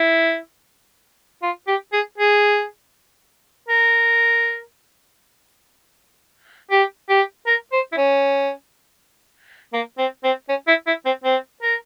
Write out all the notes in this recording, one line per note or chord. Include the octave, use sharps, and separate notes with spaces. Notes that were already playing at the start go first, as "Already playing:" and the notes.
Already playing: E4
F4
G4
G#4
G#4
A#4
G4
G4
A#4
C5
E4
C#4
A#3
C4
C4
C#4
E4
E4
C4
C4
A#4